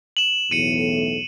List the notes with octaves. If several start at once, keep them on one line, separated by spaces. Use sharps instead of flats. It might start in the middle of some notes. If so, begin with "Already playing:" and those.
E7 F#7
B1 E2 A2 C#7 D#7